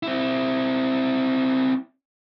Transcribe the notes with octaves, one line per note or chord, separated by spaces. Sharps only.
C4 E4